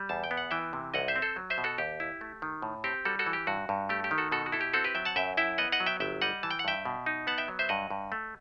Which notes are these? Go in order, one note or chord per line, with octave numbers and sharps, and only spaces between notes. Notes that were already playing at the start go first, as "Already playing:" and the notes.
Already playing: G3
E2 A5
G5
B3
F#5
E3 E5 G5
C3
C2 D#5 F#5
C5 E5
C4
A4 C5
F#3
C5 E5
B2
F#4 A4
D#2 G4
E4
A3
D#3
A2
C4 G4
G3 F#4 A4
F#4 A4
E3
G4
G2 F#4
G2
A3 G4
G4
D#3
F#4 A4
B2 F#4 A4
F#4
E4 A4
G4
C4 F#4 A4
G4 B4
F#3 E5 G5
F#5 A5
F#2 E5 G5
E4 E5 G5
B3 D#5 F#5
D#5 F#5
F#3
E5 G5
G1 E5 G5
G3 D#5 F#5
E3 A5
G5
F#5
G2 E5 G5
B2
D#4
B3 F#5 A5
E5 G5
F#3
C5 E5
G2 D#5 F#5
G2
A3